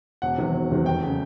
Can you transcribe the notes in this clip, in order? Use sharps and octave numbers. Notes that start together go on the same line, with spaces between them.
E1 F#5
E2 C3 D#3 F#3
E1
E2 C3 D#3 F#3
F1 G5
C#3 F#3